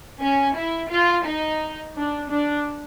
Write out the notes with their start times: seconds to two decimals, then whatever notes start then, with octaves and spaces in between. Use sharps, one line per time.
0.22 C#4
0.57 E4
0.91 F4
1.25 D#4
1.95 D4
2.29 D4